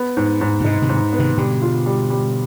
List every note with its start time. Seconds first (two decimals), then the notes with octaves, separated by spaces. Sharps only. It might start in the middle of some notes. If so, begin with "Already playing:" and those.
Already playing: B3
0.17 G#2
0.41 G#2
0.60 B2
0.64 G#2 C3 D#4
0.82 C3 D#3
0.89 G#2
1.13 B3
1.19 C3 D#3
1.38 B2 D3 G3
1.62 F4
1.86 G3
2.10 G3